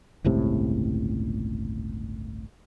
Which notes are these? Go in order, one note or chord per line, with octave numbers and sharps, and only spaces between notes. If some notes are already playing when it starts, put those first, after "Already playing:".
G1 C#2 A2 C3